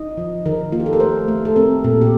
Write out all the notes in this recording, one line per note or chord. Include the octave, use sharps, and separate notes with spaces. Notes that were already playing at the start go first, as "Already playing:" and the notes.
Already playing: D#4 D#5
F3
D#3 A#4
A#3 F4
G4
A4
A#4
A3 C5
A3
A4
C4 A#4
A#2 A4
G4